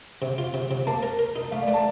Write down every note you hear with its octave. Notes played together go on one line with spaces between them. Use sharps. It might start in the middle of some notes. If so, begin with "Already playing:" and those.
C3
F4
C3
C3
A#3 A5
A#4
A#4
D#4
A3 F5
D5
A3
A5